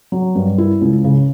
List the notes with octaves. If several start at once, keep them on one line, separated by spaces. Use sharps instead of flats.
F#3
G2
E4
C#2
C#3